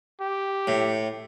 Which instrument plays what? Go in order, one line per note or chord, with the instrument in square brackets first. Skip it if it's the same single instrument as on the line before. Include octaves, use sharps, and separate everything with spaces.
[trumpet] G4
[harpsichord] A2